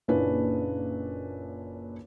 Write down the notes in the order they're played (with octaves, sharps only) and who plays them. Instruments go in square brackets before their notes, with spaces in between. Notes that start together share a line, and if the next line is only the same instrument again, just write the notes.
[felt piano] F#1 A#2 C#4 D4 E4 B4